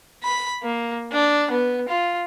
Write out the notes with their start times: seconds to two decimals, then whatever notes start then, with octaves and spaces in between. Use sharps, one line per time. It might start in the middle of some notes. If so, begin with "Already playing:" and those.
0.23 B5
0.63 A#3
1.12 D4
1.50 B3
1.89 F4